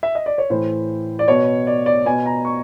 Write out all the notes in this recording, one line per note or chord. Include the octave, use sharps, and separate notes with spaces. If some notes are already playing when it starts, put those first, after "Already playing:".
E5
D#5
D5
C#5
A2 E3 C5
D5
B2 C#5
D5
D5
B2 G#5
A#5
C#6